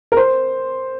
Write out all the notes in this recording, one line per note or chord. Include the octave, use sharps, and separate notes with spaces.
A#4
C5